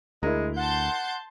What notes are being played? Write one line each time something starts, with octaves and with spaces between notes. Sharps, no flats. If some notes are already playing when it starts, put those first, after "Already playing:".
D2 G#3 E4 A#4
F#5 A5 C6 G6